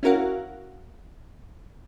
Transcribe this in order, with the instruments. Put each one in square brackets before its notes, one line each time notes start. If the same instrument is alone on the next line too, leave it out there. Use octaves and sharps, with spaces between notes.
[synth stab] C#4 E4 F#4 A#4 F5 F#5